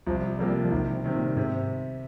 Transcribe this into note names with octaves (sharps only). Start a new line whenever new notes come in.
C2 F3
C3 F3 G3 A#3
F3
C2 D#3
C3
C3 D#3
A#2
G#2 C3